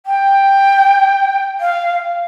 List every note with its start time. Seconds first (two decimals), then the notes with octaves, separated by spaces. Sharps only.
0.06 G5
1.60 F5